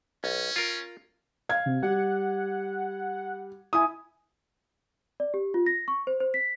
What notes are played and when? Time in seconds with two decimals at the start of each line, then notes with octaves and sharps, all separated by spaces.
0.24 B1 C#4
0.56 F4 A#4
1.49 F5 G#6
1.66 C3
1.83 G3 F#5
3.73 E4 G#5 D#6
5.20 D5
5.34 G4
5.54 F4
5.66 A#6
5.88 C#6
6.07 C5
6.20 C5
6.34 B6